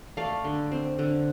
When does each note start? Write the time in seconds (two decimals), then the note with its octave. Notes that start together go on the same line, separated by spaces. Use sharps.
0.17 A3 D5 F5
0.44 D3
0.71 C4
0.99 D3